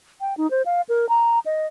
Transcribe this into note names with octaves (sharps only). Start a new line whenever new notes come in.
G5
D#4
C5
F5
A#4
A#5
D#5